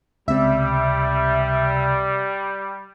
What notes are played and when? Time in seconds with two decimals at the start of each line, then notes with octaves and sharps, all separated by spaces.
0.28 C#2 C3 G3 E5